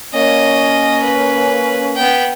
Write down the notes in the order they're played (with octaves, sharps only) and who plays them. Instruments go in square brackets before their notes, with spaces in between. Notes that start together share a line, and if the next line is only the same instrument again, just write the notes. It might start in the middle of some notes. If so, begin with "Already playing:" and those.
[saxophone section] A#3 C#4 [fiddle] D#5
[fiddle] B4
B3 G5